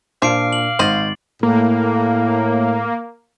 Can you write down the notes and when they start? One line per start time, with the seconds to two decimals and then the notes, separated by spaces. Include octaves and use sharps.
0.22 A#2 F3 D4 F5 D6 C7 D7
0.53 F#7
0.79 G#1 C5 D#5 A6 F#7
1.43 A2 A#3